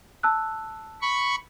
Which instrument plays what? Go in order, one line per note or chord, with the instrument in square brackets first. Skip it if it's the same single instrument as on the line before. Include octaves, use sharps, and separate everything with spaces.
[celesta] A5 E6 F#6
[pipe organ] B5 C#6